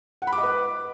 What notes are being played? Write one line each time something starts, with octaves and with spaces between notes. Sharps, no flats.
F#5
B5
D6
D#5
B4